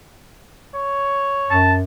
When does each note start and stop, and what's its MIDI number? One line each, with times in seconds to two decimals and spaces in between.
0.74 1.58 73
1.51 1.84 42
1.51 1.73 81